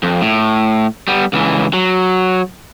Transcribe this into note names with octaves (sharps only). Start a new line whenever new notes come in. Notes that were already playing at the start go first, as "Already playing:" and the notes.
F2
A2
G3 B3
C#2 E3
F#3